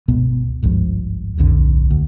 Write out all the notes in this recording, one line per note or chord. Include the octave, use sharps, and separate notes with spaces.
G1 C#2 B2 B3
G#1 C#2 G2 F3
D1 B1 F2 D3
D2